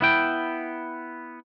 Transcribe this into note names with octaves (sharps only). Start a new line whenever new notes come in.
B3 E4 G5